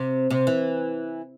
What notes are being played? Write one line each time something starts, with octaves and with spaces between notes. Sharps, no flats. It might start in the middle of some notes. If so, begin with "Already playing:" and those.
Already playing: C3
C3
E3